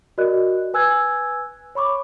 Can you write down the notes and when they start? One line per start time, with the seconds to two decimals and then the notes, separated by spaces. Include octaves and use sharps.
0.18 F#4 A#4 D5 D#5 F#6
0.74 B4 G#5 E6 F#6 G#6
1.75 C#5 B5 C#6 D6